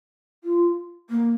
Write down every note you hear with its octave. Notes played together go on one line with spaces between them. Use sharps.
F4
A#3